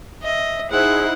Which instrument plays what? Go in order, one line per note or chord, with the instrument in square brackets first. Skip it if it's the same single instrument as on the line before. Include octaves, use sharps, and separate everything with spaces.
[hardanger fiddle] D#5 [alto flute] E5
[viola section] D#4 E4 C5 [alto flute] G#4 [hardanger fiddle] F#5